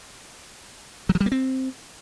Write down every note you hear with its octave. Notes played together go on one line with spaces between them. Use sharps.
F#3
F3
G3
A#3
C4